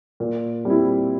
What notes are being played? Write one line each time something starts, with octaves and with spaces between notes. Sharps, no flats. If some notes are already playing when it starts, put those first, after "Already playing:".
A#2
G3 C4 E4